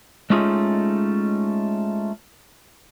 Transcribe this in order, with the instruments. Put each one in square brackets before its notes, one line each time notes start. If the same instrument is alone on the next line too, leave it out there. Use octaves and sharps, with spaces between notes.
[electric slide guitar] G#3 A3 C#4 D#4 F4 G#4